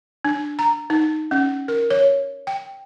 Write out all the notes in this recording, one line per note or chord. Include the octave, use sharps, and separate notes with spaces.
D4
A#5
D#4
C#4
A#4
C#5
G5